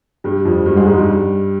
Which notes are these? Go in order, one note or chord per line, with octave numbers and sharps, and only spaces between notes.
G2 G3
F2 F3
G2 G3
G#2 G#3
G#2 G#3
G2 G3